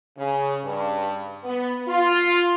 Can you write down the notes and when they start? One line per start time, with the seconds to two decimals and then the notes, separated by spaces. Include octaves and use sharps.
0.18 C#3
0.65 G2
1.44 B3
1.89 F4